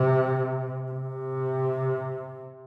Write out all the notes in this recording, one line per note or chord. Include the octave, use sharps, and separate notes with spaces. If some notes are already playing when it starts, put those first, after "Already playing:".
Already playing: C3
C3